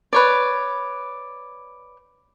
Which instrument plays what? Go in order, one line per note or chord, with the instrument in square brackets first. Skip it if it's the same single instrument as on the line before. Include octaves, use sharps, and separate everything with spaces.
[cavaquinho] B4 C#5 D5